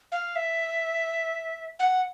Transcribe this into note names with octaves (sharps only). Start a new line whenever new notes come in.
F5
E5
F#5